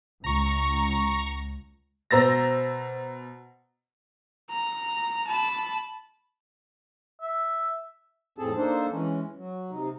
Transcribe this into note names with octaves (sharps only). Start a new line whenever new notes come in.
C#2 A#5 C#6
B2 C5 A#5 E6 A6 A#6
A#5
A5 B5
E5
F2 A2 C4 G#4 A4 A5
A#3 D4 D#4 A4 C5
E3 G#3 C#4
F#3
C3 D#4